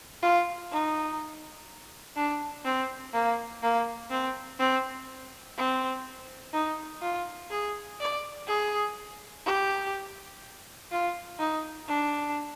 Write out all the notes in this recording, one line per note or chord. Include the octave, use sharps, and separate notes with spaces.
F4
D#4
D4
C4
A#3
A#3
C4
C4
C4
D#4
F4
G#4
D5
G#4
G4
F4
D#4
D4